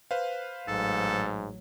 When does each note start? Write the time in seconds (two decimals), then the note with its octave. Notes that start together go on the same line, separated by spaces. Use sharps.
0.11 B4 C5 F5
0.68 A1 G#2 F#3 A4